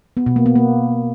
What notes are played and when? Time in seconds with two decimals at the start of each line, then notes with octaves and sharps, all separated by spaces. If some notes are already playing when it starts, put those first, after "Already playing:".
0.17 B3
0.26 B2
0.36 A#3
0.46 B3
0.56 A#3